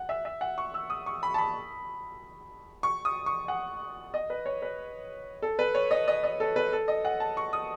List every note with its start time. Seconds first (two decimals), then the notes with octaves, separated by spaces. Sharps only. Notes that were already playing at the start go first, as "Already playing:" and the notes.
Already playing: F#5
0.09 E5
0.25 E5
0.41 F#5
0.58 C#6
0.74 E6
0.90 D#6
1.06 C#6
1.23 B5
1.34 A5
1.38 B5
2.83 C#6
3.05 D#6
3.26 C#6
3.48 F#5
4.14 D#5
4.30 B4
4.46 C#5
4.62 B4
5.42 A4
5.59 B4
5.75 C#5
5.91 D#5
6.08 D#5
6.24 D#5
6.40 A4
6.56 B4
6.72 A4
6.88 D#5
7.05 F#5
7.20 A5
7.37 C#6
7.53 D#6